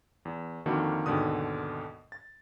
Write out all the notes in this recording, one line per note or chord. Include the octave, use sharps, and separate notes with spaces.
E2
F2 D3 D#3 A#3 F#4
D#2 G#2 B2 D3 D#6
A6